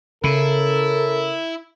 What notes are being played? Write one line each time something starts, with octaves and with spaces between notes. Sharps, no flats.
C#3 C#4 E4 A4 A#4